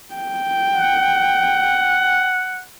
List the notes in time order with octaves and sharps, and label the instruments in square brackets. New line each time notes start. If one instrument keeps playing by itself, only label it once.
[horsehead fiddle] G5
[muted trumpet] F#5